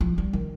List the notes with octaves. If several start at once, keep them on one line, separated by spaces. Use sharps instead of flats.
F3
G3
D#3